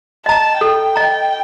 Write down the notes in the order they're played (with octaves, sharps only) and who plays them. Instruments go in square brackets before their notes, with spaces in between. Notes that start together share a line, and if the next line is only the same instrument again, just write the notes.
[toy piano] D#5 A#5 [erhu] A5
[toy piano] A4 [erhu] G5
[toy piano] D#5 A#5